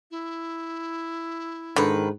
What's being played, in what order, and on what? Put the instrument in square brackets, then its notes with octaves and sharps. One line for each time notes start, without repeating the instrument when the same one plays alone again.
[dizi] E4
[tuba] G#2 [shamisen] D3 [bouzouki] D#3 B4